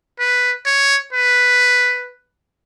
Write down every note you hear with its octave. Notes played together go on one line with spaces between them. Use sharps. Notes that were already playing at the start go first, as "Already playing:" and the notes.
B4
C#5
B4